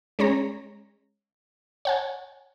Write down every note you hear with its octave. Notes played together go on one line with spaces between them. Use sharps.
G#3 C#4 C#5 A#5
C#5 F#5 G#5